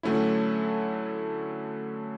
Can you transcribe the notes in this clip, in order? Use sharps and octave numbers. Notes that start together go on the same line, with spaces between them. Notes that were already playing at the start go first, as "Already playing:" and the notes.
D3 F#3 A3 C#4 E4